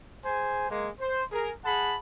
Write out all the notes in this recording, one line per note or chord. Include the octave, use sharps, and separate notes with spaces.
G#4 C5 G#5
G#3 A#3
C5
G#4 A#4
G#4 F#5 A5 B5